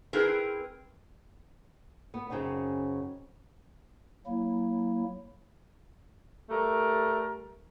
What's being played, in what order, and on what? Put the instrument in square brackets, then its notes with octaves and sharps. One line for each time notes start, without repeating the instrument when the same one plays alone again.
[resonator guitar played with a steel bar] C4 E4 G#4 A#4 B4
[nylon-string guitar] B3
F#2 C#3 C4 C#4 D#4
[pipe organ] F#3 A#3 E4
[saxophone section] G3 A3 A#4